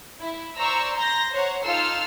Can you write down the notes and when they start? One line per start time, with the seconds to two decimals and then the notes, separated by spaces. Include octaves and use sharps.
0.20 E4
0.58 C5 D5 A#5 C#6 E6
0.98 A#5 C6 G6 A#6
1.32 C5 C#5 F#5 A#5
1.63 D#4 F4 A4 E6 F6 C7